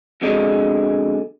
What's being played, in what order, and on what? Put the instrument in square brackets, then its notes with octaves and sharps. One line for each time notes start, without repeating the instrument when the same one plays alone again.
[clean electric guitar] F2 B2 D3 G#3 D4